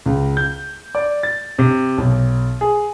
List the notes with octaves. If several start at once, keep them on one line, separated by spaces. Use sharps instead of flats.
C#2
G6
D5
A6
C3
B1
G#4